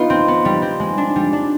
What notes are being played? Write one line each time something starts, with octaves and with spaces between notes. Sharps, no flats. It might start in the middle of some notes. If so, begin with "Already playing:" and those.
Already playing: B3 D#4 F4
C4
B3
G3
C4
G#3
D4
G3
D4